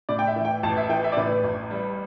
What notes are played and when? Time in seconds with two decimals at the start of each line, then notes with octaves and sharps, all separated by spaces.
0.09 A2 D5
0.19 G5
0.27 E5
0.36 E3
0.45 G5
0.63 A1 A5
0.77 E5
0.89 E3 G5
1.04 E5
1.12 D5
1.17 A2 B4
1.44 A1
1.71 G3